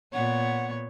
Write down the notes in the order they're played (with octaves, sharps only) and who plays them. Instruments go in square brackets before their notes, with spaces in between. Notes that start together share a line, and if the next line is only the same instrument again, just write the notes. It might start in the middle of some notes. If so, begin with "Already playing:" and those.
[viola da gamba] A#2 B3 C#5 [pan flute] F#5